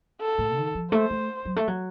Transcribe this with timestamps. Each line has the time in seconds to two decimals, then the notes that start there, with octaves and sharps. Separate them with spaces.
0.21 A4
0.38 A2
0.56 D#3
0.75 F3
0.92 A3 C5
1.10 A3
1.45 F#3
1.56 A3
1.67 F#3